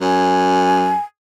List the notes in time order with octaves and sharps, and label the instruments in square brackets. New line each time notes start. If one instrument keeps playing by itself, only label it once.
[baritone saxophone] F#2 [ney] G#5